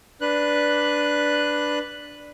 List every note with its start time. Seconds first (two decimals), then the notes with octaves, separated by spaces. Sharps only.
0.21 D4 B4 F#6